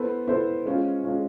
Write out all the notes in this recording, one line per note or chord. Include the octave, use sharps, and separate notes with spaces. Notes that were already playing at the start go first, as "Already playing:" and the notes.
Already playing: B3 E4 A4 C5
B3 E4 A4 C5
G#3 C#4 F4
G#3 C#4 F4